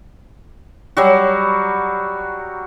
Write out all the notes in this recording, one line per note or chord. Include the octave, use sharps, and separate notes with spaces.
F#3 G3 F#4